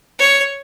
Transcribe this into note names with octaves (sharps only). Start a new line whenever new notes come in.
C#5